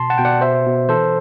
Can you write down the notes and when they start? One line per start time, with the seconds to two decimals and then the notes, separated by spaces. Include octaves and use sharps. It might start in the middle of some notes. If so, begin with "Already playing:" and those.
Already playing: B2 A5 C6
0.10 F#5 A5
0.18 B2 G5
0.25 D5 F#5
0.41 B2 C5 E5
0.66 B2
0.89 E3 A4 C5